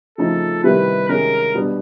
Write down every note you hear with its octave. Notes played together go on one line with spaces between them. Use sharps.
C#3 F3 A3 C4 D#4 A4
C3 D#3 G3 C4 E4 B4
C3 D#3 G#3 C#4 A#4
B2 G3 B3 D4